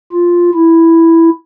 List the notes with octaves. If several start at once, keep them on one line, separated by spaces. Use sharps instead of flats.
F4
E4